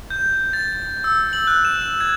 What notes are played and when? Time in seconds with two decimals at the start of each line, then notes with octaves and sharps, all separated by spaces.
0.10 G6
0.53 A6
1.04 E6
1.33 F#7
1.47 F#6
1.65 E7
2.01 G#6